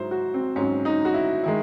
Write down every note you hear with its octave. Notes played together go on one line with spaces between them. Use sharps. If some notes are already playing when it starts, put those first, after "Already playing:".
Already playing: G#2 F#3 E4 C5
F#4
C4
G#2 F#3 C#4
D#4
F#4
E4
D#3 G#3 E4